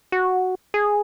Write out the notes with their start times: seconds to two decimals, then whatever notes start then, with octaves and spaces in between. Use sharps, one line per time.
0.12 F#4
0.74 G#4